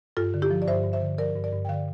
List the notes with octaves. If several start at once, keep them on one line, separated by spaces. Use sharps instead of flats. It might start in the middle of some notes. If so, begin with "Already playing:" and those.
G2 F4 A4
D3
E4 G4
F3
D5
G2 C5 E5
G2
C5 E5
D3
F3 A#4 D5
G2
A#4 D5
G2
G5
D3 D5 F5